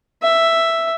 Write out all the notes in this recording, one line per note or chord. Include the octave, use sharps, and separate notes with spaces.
E5